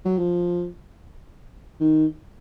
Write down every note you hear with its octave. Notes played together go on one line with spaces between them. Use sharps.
F#3
F3
D#3